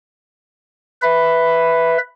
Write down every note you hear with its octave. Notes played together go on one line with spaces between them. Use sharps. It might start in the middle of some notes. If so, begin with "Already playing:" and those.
B4 E5 B5